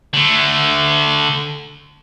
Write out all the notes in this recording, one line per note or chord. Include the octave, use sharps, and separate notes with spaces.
D3 A3